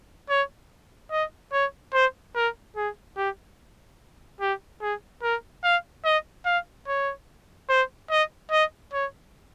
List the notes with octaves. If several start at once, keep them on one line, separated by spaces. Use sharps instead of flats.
C#5
D#5
C#5
C5
A#4
G#4
G4
G4
G#4
A#4
F5
D#5
F5
C#5
C5
D#5
D#5
C#5